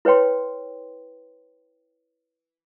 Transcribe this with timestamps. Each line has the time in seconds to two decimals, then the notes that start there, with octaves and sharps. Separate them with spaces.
0.05 E4 B4 C#5 G5 C6